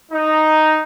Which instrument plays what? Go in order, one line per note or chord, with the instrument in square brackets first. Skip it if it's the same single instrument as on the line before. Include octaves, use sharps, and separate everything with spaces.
[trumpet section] D#4